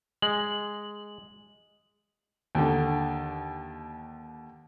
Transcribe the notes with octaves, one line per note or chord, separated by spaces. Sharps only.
G#3 F#7
D#2 D3